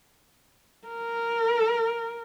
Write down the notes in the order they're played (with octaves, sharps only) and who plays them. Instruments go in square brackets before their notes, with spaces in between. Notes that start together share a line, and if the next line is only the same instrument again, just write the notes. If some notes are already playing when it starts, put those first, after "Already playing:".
[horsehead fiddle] A#4